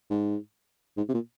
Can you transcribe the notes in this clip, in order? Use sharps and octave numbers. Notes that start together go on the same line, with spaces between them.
G#2
G#2
C3
A#2